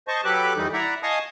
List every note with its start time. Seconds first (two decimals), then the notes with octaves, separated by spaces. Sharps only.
0.08 C5 D#5 A5 C#6
0.25 F#3 G4 A4 B4 D6 F#6
0.57 F2 D#3 E3 G3 D#4
0.73 E4 D5 E5 F#5 A#5
1.03 D#5 F5 G#5 A5 C#6 D#6